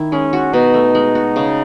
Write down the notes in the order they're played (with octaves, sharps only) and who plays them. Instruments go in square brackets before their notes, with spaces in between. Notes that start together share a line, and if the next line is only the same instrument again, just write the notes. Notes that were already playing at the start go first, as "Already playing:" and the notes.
Already playing: [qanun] D#3 E4
[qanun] G#3 [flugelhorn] C#4
[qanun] F#4
[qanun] B2 [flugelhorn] D#4
[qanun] A3
G#3
F#4
C#3